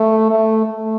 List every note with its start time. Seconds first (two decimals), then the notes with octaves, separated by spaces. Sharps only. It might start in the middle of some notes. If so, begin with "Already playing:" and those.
Already playing: A3
0.30 A3
0.65 A3